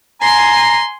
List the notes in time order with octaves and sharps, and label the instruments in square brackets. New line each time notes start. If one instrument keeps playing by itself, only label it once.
[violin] G#5 C7 [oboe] A#5 [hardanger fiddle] C6